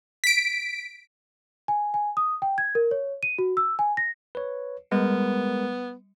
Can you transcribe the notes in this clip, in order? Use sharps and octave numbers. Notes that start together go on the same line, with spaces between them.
B6 D7
G#5
G#5
D#6
G5
G#6
A#4
C#5
D#7
F#4
E6
G#5
A#6
B4 C#5
G3 G#3 B3 A#4